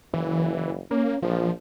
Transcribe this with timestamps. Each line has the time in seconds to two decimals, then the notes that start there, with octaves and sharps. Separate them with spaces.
0.14 F#1 E3
0.91 A#3 C#4
1.22 A#1 F3